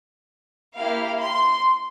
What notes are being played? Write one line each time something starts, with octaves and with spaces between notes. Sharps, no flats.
A#3 E4 G4 F5
C6